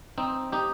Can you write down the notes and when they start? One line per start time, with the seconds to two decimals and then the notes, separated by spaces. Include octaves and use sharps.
0.18 C4 D#4
0.52 D#4 G4